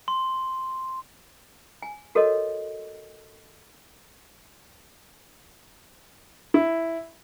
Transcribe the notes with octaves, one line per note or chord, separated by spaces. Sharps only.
C6
G#5
F#4 A4 A#4 C#5 D#5
E4